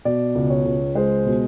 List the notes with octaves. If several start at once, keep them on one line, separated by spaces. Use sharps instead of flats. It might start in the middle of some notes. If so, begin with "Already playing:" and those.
B2 D5
C#2
C#5
C#2
G#3 C5
B2